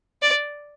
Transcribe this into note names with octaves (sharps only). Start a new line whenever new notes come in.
D5